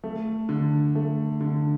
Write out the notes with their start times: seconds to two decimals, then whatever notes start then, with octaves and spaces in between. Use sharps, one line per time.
0.04 A3
0.49 D3
0.95 A3
1.41 D3